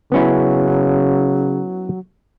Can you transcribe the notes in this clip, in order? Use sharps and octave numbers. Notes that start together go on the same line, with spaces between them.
C#3 F#3 B3 C#4 E4